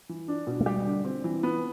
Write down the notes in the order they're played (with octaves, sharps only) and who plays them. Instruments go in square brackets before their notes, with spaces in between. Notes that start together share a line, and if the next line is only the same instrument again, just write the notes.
[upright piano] E3
D4
B2
[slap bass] A3
[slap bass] G3 [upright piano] G4
[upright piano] D3
C4
E3
B3